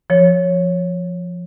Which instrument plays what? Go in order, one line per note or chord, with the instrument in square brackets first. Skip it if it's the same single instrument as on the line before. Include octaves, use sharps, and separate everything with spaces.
[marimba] F3 C#5